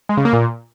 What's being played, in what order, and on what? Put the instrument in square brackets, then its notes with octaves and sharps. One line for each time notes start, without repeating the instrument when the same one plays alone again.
[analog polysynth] G#3
C#3
A#3
A#2